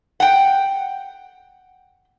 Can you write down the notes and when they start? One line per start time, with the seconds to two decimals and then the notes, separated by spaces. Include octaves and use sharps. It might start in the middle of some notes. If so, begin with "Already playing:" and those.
0.20 F#5 G5